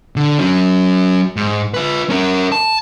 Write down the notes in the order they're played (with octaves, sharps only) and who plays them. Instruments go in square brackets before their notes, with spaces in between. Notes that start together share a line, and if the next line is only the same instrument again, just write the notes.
[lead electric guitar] D3
F#3 C#4
G#2
F4 B4
C#4 A#4
A5